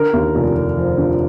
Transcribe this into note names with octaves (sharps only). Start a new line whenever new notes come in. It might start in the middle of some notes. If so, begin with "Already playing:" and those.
Already playing: D3 A#4
D#2
F1
F1
F3
D3